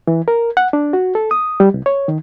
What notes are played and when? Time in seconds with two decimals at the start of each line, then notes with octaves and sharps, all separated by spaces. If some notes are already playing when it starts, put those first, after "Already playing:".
0.07 E3
0.28 A#4
0.57 F#5
0.73 D4
0.93 F#4
1.15 A4
1.31 D#6
1.60 G3
1.74 C2
1.86 C#5
2.08 D#3